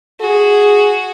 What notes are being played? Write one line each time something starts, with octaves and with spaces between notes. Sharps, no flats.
F#4 G#4